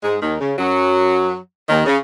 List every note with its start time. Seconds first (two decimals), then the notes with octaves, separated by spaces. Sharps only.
0.03 G#2 G#3
0.22 D#2 D#3
0.40 C#3
0.59 F#2 F#3
1.69 D#2 D#3
1.86 C#3